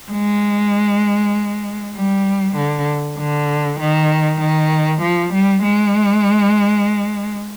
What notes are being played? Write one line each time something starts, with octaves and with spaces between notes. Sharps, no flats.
G#3
G3
D3
D3
D#3
D#3
F3
G3
G#3